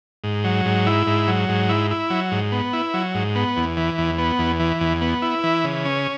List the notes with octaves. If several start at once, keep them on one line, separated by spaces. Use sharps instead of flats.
G#2
F#3
G#2
E4
G#2
F#3
G#2
E4
E4
F#3
G#2
B3
E4
F#3
G#2
B3
E2
E3
E2
B3
E2
E3
E2
B3
E4
E3
C#3
C#4